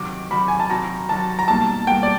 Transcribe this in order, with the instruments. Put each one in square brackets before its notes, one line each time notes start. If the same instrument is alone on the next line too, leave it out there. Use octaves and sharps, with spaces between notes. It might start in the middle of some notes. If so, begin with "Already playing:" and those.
Already playing: [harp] C3 D#3 F#3 [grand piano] D6
[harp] C3 D#3 F#3 [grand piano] B5
[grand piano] G#5
A5
[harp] C3 D#3 F#3 [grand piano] A#5
[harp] C3 D#3 F#3 [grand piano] A5
[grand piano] A#5
[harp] B2 G3 A#3 D#4 [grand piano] A5
[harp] B2 G3 A#3 D#4 [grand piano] G5
[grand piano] D5